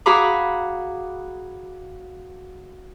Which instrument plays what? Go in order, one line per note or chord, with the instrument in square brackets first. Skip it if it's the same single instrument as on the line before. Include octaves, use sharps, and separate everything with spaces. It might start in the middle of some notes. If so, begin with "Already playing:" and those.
[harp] F#4 G#4 F5 A#5 B5 D6